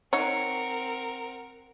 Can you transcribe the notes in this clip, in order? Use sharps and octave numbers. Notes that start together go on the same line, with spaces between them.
C4 D#4 A#4 C#5 F#5 C#7